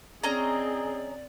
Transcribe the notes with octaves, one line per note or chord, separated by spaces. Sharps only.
C4 C#4 G#4 D5 D#5 A#5